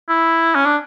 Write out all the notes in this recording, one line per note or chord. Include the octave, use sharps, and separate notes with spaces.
E4
C#4
D4